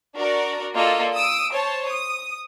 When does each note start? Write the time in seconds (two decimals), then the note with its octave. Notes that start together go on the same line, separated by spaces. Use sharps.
0.16 D4 F#4 A#4 D5
0.74 A#3 F4 A4 D5 D#5
1.13 D#6 E6 D7
1.52 C5 C#5 A5
1.88 D#6